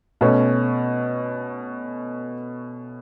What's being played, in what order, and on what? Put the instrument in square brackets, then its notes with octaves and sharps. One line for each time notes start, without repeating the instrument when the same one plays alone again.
[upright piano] B2 A3 C#4